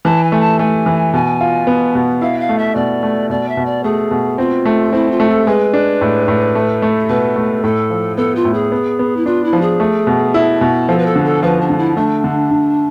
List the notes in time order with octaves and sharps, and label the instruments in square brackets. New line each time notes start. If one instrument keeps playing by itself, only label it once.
[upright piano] E3 [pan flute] A5
[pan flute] G#5
[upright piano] A3
[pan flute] A5
[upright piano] A3 [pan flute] G#5
[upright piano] E3
[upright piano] B2 [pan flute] G#5
[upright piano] F4
B3
B2
[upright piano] E4 [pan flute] F5
[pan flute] F5
[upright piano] A3
[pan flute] E5
[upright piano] B2 [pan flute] D5
[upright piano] A3
[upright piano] B2 [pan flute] D5
[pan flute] E5
[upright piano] B2
[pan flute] D5
[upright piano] A3 [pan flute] G#4
[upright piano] B2
[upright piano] C4 [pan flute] F4
[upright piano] A3
[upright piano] C4 [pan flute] E4
[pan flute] F4
[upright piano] A3
[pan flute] A4
[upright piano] G#3 [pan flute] B4
[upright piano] D4
A2
A2
A3
A3
[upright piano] B2 [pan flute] B4
[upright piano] A3
[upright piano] A2 [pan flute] A4
[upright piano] F3
[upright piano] B3 [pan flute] A4
[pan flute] F4
[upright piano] A2
[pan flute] G#4
[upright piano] B3
B3
[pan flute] E4
[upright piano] D4 [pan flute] F4
[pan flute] E4
[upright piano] F3
[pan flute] G#4
[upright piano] A3
B2
E4
B2
[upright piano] F3 [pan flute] A4
[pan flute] B4
A4
[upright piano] D3
[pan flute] A4
[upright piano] F3 [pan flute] B4
[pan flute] D4
[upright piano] D3
[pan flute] E4
[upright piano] A3 [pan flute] D4
[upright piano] D3
D3